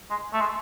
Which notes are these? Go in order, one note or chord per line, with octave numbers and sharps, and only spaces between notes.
G#3
A3
G#3